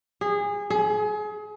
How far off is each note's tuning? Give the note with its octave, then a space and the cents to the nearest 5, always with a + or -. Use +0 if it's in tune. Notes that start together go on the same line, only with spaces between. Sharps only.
G#4 -25
G#4 +30